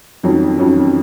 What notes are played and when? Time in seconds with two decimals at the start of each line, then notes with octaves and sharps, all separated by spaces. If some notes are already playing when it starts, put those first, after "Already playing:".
0.23 F2 D#3 F#3 C#4
0.58 F2 D#3 F#3 C#4